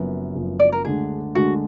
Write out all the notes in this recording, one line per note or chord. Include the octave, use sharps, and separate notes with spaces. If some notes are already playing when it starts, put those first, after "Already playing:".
Already playing: F#1 F#2 F3 B3
F#1 F#2 F3 B3
D5
A#4
D2 D3 G#3 D4 G#4
D2 D3 G#3 D4 F#4